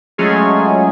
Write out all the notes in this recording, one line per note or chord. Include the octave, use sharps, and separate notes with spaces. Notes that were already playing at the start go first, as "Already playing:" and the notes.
F#3 G#3 A3 C#4 F4 G#4